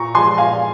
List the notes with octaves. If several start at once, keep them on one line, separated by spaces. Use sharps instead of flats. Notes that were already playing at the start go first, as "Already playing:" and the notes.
Already playing: A#2 A#5 C#6
F3 G#3 G#5 C6
A#2 F5 G#5